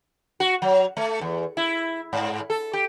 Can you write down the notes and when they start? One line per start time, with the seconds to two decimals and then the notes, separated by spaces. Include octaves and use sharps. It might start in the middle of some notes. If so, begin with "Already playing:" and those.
0.40 F#4
0.62 F#3
0.97 A3
1.21 E2
1.57 E4
2.13 G#2
2.50 A4
2.73 G4